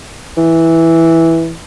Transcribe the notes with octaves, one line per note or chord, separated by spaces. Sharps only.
E3